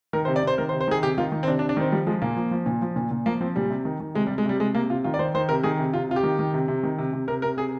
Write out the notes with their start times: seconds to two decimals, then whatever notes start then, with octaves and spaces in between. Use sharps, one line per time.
0.13 D#3 A#4
0.25 C5
0.28 C3
0.36 D5
0.43 C3 C5
0.58 D#3 A#4
0.69 C5
0.73 C3
0.81 C5
0.88 D#3 G#4
1.02 C3 G4
1.18 D#3 F4
1.32 D#3
1.43 C4
1.47 C3 D4
1.59 D4
1.62 C3
1.69 D4
1.77 D#3 C4
1.92 F3 G3
2.07 F3 G#3
2.22 A#2 A#3
2.36 F3
2.51 F3
2.66 A#2
2.82 F3
2.96 A#2
3.11 A#2
3.26 F3 A#3
3.41 F3 C4
3.56 A#2 G3
3.70 C3
3.85 D#3
4.00 D#3
4.15 C3 G#3
4.27 G3
4.30 C3
4.38 G#3
4.45 C3 G3
4.60 C3 G#3
4.75 C3 A#3
4.90 C3 F4
5.04 D#3 F4
5.14 D5
5.19 D#3 C5
5.34 D#3 C5
5.49 C3 A#4
5.63 D#3 G#4
5.79 C3
5.93 C3 F4
6.09 C3 F4
6.16 G4
6.23 D#3
6.39 D#3
6.54 C3
6.68 C3
6.83 D#3
6.98 C3
7.13 C3
7.27 C3 A#4
7.42 C3 A#4
7.57 C3 G#4